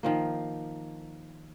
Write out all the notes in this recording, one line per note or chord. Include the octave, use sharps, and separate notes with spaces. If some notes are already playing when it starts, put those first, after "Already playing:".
D#3 F3 A#3